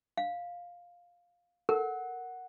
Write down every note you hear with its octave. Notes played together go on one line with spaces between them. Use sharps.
F5
A4 A#4 F#5